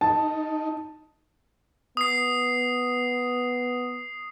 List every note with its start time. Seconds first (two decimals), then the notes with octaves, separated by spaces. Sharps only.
0.01 D#4 A5
1.97 B3 D#6 C7